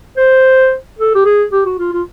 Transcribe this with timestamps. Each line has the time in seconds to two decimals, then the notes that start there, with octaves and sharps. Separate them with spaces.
0.17 C5
0.99 A4
1.15 G4
1.25 G#4
1.52 G4
1.65 F#4
1.79 F4
1.93 F4